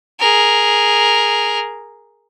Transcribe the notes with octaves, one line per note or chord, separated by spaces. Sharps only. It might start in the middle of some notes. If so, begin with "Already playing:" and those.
G#4 A#4